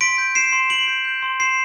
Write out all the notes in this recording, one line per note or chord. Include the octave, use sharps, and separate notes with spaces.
C6 B6 D7
G6
G6 C7 E7
C6
C6 D7 F#7
G6
G6
C6
C6 C7 E7